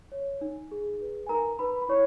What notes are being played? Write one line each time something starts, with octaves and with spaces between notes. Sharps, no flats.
C#5
D#4
G#4
B4
G#5
D#4 A#4 A#5
D#4 B4 B5
B5
E4 C#5 C#6